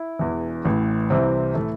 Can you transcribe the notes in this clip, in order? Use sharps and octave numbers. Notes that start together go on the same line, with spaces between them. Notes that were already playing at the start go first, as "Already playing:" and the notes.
Already playing: E4
E1 E2 E3
A1 A2 E3
C2 C3 E3 C4
A2 E3 A3